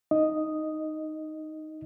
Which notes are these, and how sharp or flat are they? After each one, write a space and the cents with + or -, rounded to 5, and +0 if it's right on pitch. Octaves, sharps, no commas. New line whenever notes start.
D#4 +0 D#5 +0